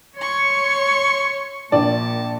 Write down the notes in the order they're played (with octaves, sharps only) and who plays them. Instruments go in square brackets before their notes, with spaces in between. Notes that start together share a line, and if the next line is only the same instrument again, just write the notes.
[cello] C#5 [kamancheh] C6 C#6
[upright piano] A#1 D5 [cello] A#2 [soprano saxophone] A5